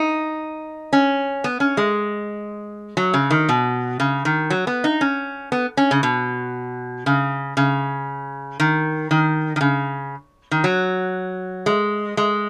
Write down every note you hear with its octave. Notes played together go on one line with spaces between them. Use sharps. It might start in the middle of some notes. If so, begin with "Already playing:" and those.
Already playing: D#4
C#4
B3
C#4
G#3
F#3
C#3
D#3
B2
C#3
D#3
F#3
B3
D#4
C#4
B3
C#4
C#3
B2
C#3
C#3
D#3
D#3
D#3
C#3
D#3
F#3
G#3
G#3